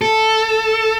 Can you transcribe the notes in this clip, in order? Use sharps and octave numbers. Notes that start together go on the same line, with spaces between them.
A4